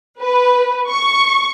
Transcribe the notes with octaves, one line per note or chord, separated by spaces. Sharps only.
B4
C#6